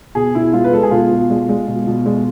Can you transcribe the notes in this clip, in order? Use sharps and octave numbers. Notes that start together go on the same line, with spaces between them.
B2 G#4
B2 E4
G#3 F4
B4
G#3 A4
G#4
B2 F4
B2
G#3
G#3
B2
B2
G#3